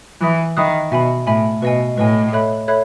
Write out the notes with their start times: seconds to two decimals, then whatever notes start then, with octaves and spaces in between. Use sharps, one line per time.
0.21 E3 E5 B5 D#6 F#6
0.57 D#3 E5 B5 D#6 F#6
0.91 B2 E5 G#5 B5
1.27 A2 E5 G#5 B5
1.62 B2 B4 D#5 G#5
1.97 A2 B4 D#5 G#5
2.33 A4 C#5 E5 B5 F#6
2.68 A4 C#5 E5 B5 F#6